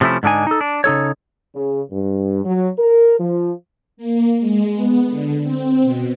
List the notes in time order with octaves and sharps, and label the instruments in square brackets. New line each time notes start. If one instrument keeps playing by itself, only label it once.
[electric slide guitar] C3 F3 A3 C#4 E4
G#2 D3 D4 D#4 G#5
D#4 A4
D4
C#3 D#4 A4 C#5
[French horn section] C#3
G2
F#3
A#4
F3
[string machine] A#3
G#3
B3
D3
C4
B2